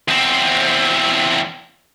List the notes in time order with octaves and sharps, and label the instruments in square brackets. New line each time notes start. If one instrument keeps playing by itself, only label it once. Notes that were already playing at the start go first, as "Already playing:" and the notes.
[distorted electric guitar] E2 C4